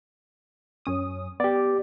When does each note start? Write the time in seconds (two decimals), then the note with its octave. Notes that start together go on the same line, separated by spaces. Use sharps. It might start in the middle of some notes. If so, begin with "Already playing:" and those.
0.85 F#2 C#4 D#6
1.40 B3 G4 D5